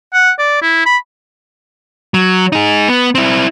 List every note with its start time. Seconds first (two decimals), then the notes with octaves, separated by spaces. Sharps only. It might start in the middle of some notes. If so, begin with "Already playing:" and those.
0.14 F#5
0.39 D5
0.62 E4
0.86 B5
2.14 F#3
2.52 D#4 G#4
2.88 B3
3.15 C4 E4